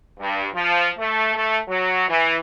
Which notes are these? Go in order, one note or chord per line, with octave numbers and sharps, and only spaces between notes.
G2
F3
A3
A3
F#3
E3